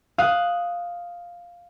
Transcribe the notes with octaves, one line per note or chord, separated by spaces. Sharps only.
F5 D#6 F#6